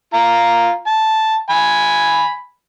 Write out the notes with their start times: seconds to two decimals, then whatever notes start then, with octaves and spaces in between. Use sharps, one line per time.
0.14 F4 A#5
0.86 A5
1.50 G#5 B5